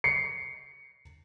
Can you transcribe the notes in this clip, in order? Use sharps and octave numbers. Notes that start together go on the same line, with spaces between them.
C7 C#7